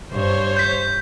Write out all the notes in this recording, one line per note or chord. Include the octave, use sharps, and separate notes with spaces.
G2 C5 C#5
G6 B6